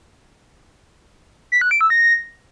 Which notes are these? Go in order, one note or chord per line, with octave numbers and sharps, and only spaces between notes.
B6
F#6
D7
E6
A#6